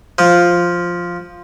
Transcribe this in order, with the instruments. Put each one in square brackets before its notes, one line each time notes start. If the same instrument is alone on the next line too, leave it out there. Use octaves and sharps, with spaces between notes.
[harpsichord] F3